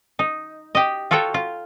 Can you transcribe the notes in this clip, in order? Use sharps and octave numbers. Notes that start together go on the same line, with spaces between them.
D#4
G4 D#5
F4 F#4 A4 C#5 G5
F4